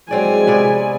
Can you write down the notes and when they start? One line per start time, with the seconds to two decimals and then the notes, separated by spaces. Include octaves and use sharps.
0.11 F#3 G#3 C4 D5 G#5
0.47 C3 B3 D5